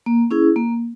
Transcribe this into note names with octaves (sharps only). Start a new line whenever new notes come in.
A#3
C#4 E4 G#4
A#3